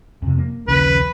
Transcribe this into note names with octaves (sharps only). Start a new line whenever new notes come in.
F2 C3
A#3
A#1 D#2 C#3 B4